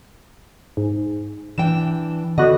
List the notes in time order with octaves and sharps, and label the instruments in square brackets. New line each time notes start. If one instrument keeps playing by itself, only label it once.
[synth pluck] G#2
[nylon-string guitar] E3 D4 G5 [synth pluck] E7
[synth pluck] D3 B3 F#4 [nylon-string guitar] D#5